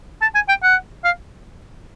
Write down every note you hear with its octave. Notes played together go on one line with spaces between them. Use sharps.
A5
G#5
G5
F#5
F5